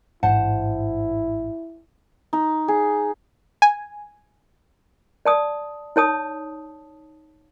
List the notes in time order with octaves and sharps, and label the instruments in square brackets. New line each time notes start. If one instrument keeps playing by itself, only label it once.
[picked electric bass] A1 G#2 D4 [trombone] E4 [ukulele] C5 F#5 A5
[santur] D#4
G#4
[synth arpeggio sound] G#5
[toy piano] D5 A5 D#6
D#4 C#5 A5 D#6